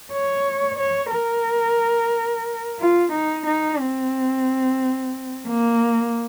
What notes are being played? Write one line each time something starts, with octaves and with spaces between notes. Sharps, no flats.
C#5
C#5
A#4
F4
D#4
D#4
C4
A#3